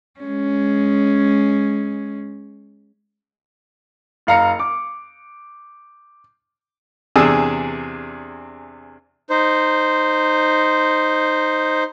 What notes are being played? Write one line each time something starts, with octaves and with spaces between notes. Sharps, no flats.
G#3 C#4
F#1 F5 A#5 C#7
D6
E2 C3 D4 G#4 E6
D#4 C5